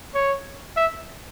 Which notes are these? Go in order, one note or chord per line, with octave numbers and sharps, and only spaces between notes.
C#5
E5